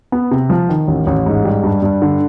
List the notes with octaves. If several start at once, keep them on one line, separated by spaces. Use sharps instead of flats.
B3
C3
F3
D#3
A1
A1
G#2
G3
G2
G2
D3